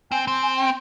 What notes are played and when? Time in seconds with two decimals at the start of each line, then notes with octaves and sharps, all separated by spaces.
0.11 C4 G#5
0.27 C4
0.43 G#5
0.57 G5